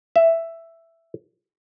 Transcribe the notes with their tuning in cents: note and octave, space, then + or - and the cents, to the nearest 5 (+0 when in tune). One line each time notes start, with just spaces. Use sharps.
E5 +5